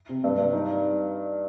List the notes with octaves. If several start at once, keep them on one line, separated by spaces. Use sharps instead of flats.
C3
G2
G2
D#4